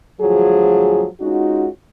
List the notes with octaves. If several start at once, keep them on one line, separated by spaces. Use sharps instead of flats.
D2 G2 F3 F#3 G#4
G#3 C#4 D#4 F4 F#4